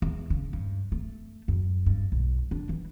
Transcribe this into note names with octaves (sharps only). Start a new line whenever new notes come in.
E2
C#3
G2
A3
F#2
G2
B1
D4
E3